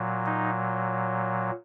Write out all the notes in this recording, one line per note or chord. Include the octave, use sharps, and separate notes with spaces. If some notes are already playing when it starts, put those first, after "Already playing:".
Already playing: A#2 F#3
D#4